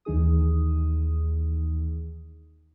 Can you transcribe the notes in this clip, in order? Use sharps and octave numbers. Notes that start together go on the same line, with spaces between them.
D#2 E3 D#4 G#4 D#6